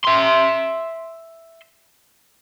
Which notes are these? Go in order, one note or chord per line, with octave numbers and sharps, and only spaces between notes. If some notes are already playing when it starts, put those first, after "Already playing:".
E5 C6